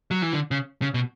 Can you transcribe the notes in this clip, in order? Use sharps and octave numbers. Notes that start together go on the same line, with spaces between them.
F#3
E3
D3
C#3
C#3
B2